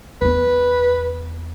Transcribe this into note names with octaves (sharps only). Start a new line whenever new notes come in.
E2 B3 B4